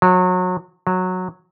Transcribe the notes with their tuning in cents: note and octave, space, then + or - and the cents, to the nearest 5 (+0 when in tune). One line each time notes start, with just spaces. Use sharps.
F#3 -30
F#3 -15